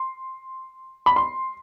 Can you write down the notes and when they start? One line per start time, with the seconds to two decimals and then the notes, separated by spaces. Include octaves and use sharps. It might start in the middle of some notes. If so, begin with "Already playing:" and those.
Already playing: C6
1.06 B5
1.16 C6